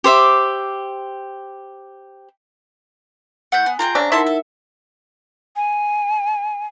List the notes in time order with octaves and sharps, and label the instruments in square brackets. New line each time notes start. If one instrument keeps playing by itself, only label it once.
[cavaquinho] G4 C5 E5 D6
[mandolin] A3 E4 G6 [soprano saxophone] F#5
[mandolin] B3 [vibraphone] G#5
[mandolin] F4 G#4 G5 [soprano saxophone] A#5
[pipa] C#3 D4 [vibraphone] C5 [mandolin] E6
[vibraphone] D#4 A#4 F#5 [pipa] E4 E5 [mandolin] A4 A5 C6
[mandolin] A4
[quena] G#5